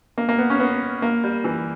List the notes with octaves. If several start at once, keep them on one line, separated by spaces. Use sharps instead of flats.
A#3
A#3
B3
C#4
B3
A#3
G3
E3